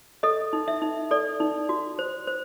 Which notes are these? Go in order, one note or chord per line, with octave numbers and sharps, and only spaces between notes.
A4 D#5
D#4
E5
D#4
A4 D5
D#4
F#4
C5
C5